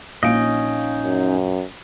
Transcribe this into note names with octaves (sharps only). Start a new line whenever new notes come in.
A#1 C#4 D#4 D#5 F5 D7
F#2